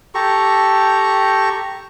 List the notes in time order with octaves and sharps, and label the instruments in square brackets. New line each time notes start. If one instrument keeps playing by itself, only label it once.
[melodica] G4 A4 A#5 C#6